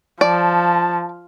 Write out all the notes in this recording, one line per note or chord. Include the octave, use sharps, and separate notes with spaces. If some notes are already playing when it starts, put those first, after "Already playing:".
F3 D5 A5